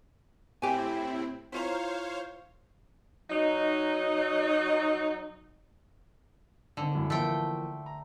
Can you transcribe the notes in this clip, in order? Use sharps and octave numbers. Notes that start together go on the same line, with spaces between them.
A2 C4 E4 G4 G#5
E4 F4 C5 C#5 F5 A#5
F#3 D#4
D3 D#3 C4
F#2 A2
E3 F3 A3 A#3 G5
A#5